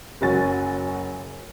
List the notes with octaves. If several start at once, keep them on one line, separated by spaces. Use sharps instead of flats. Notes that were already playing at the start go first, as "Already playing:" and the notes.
F#1 F#3 F#4 G#5 A6